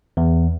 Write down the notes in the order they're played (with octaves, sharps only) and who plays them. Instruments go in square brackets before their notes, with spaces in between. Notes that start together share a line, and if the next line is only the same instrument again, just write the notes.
[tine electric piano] E2